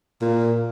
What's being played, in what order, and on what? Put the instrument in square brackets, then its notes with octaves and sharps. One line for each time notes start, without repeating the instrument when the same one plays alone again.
[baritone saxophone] A#2